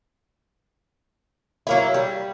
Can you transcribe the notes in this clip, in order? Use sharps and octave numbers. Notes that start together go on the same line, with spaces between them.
F#3 A#3 E4
G3